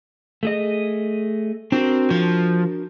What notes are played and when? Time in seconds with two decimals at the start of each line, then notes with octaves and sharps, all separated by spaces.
0.43 A3 G#4 D#5
1.72 C4 D4 F#4 A#4
2.11 F3